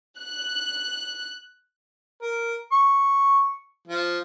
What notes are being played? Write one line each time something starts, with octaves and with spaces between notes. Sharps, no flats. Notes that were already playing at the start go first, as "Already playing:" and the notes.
F#6
A#4
C#6
F3